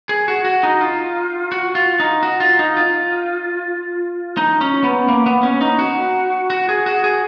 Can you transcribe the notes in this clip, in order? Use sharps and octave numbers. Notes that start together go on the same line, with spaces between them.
G#4
F#4
F#4
D#4
F4
F#4
F4
D#4
F#4
F4
D#4
F4
D#4
C#4
B3
A#3
B3
C#4
D#4
F#4
F#4
G#4
F#4
G#4